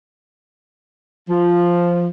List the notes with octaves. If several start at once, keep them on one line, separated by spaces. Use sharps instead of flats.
F3